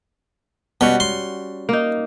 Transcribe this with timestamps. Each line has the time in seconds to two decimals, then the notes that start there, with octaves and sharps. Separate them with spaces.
0.81 B2 G3 C#4 F#4
1.00 C6
1.69 A#3 D#4